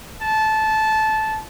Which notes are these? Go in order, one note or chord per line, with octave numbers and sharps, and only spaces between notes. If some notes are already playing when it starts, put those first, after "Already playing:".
A5